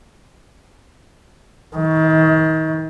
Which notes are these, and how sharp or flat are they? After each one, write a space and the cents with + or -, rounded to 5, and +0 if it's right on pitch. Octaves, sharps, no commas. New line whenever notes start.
D#3 +35